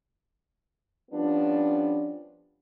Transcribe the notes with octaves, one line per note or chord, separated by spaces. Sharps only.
F3 G3 B3 C#4 D4